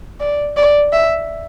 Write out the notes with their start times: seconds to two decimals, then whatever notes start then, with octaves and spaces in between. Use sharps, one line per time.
0.20 D5
0.57 D5
0.93 E5